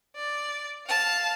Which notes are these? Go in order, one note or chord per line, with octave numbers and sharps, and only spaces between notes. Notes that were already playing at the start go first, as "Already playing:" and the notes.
D5
F5 A5